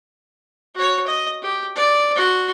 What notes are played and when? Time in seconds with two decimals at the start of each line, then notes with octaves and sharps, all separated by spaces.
0.75 F#4 C#5
1.06 D#5
1.42 G4
1.76 D5
2.15 F#4 C6